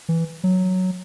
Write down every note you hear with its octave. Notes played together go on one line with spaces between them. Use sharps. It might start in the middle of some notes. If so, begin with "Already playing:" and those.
E3
F#3